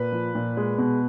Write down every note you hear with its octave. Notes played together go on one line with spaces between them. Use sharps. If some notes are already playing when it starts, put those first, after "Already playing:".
Already playing: A#2 B4
F3
A#2
G#3
B2